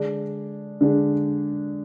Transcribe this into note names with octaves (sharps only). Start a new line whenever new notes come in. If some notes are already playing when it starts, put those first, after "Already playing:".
Already playing: D3 G#3 D4 G#4
D3 G#3 D4 G#4